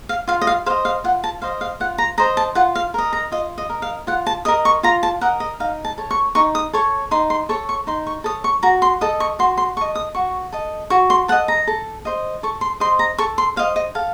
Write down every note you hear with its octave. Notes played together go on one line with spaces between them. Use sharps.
F5
F4 F5
D#5
F5
C5 D#5 F5
F5
F4 F#5
A5
C5 D#5 F5
F5
F4 F#5
A#5
C5 D#5 A#5
A5
F4 F#5
F5
A#4 D#5
A#5
F4 D#5
D#5
A#4 D#5
F5
F4 F#5
A5
A#4 D#5 D#6
C#6
F4 A#5
A5
A#4 D#5 F#5
D#5
D#4 F5
A5
A4 C#5
C#6
D#4 C#6
D#6
A4 C#5 C#6
D#4 C6
C6
A4 C#5 C#6
C#6
D#4 C6
C#6
A4 C#5 D#6
C#6
F#4 A#5
C6
A4 D#5 D#6
C#6
F#4 C6
C6
A4 D#5 C#6
D#6
F#4 C#6
A4 D#5
F#4 C#6
C6
A4 D#5 F#5
A#5
A4
C5 D#5
A4 C#6
C6
C5 D#5 C6
A#5
A4 C#6
C6
C5 D#5 F5
D#5
A4 F5